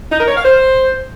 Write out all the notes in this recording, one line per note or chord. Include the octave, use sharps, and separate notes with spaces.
D#4
A#4
C#5
F5
C5